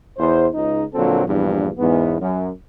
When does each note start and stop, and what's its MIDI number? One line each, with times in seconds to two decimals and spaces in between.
0.18 0.47 40
0.18 0.47 72
0.54 0.83 37
0.54 0.83 63
0.94 1.22 34
0.94 1.22 46
0.94 1.22 50
0.94 1.22 54
0.94 1.22 60
0.94 1.22 69
1.27 1.68 34
1.27 1.68 40
1.27 1.68 43
1.78 2.16 40
1.78 2.16 44
1.78 2.16 59
2.19 2.49 42